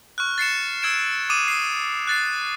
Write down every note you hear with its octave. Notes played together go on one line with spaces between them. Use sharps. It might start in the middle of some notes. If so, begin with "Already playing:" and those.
C#6 F6 F#6
A6 C7 C#7 E7
E6 G#6 D7 E7
D6 D#6 D#7 E7
D#6 C7
F#6 A6 C7